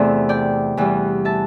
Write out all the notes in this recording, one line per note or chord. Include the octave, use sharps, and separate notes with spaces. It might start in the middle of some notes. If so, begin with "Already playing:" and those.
Already playing: E2 C3 A3 A4 C5 D5 E5
D5 G5
E2 E3 G3
E5 A5